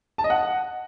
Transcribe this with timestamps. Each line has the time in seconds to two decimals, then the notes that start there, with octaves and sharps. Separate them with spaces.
0.18 A5
0.24 D#5
0.30 F#5